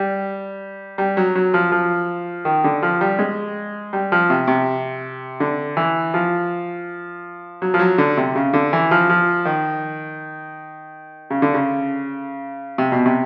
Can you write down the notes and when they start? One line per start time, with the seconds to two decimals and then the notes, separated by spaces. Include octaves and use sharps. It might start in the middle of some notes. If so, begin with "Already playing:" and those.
Already playing: G3
0.98 G3
1.17 F#3
1.35 F#3
1.54 F3
1.72 F3
2.45 D#3
2.64 D3
2.83 F3
3.01 G3
3.19 G#3
3.93 G3
4.12 F3
4.30 C3
4.48 C3
5.40 D3
5.77 E3
6.14 F3
7.62 F#3
7.74 F3
7.79 F#3
7.98 D3
8.17 C3
8.36 C#3
8.53 D3
8.73 E3
8.91 F3
9.09 F3
9.45 D#3
11.30 C#3
11.42 D3
11.54 C#3
12.78 C3
12.92 B2
13.06 C3